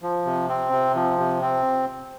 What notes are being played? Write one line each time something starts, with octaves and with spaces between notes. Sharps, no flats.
F3
C3
C4
C3
F3
C3
C4